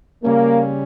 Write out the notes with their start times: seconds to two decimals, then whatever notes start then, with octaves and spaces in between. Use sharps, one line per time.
0.24 C#3 G3 A#3 C#4